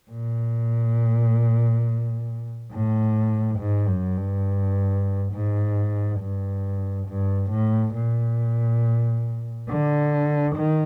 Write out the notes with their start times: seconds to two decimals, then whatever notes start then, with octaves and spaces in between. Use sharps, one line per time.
0.10 A#2
2.72 A2
3.59 G#2
3.88 F#2
4.17 G2
5.33 G#2
6.20 G2
7.07 G2
7.51 A2
7.94 A#2
9.68 D3
10.55 D#3